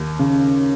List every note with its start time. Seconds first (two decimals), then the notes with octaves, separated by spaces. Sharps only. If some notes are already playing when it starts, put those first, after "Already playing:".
Already playing: D#2
0.19 C#3